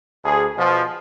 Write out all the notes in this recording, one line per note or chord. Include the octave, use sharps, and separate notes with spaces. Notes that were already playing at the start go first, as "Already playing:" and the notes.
D2 G#4
B2 F3